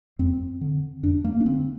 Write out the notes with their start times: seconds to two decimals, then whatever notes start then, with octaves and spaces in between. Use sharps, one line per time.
0.19 F2 C4
0.61 D3
1.03 F2 D4
1.25 A#3
1.40 D4
1.45 D3 C4